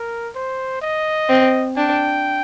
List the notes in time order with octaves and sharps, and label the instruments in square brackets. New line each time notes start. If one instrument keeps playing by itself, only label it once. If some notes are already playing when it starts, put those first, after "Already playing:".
Already playing: [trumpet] A#4
C5
D#5
[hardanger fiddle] C4
[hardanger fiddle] D4 [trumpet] G5